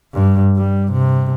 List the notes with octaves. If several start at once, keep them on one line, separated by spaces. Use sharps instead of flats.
G2
G3
C3